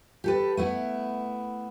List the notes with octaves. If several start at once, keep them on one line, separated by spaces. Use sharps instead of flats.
G4 A4 B4
A3 B3 E4